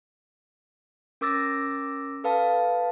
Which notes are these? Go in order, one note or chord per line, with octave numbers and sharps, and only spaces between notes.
C#4 A#4 D6 E6 A6 A#6
A4 B4 F5 A5